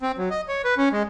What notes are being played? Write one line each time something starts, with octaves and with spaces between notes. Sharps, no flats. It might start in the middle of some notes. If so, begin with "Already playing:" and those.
C4
F#3
D#5
C#5
B4
C#4
G#3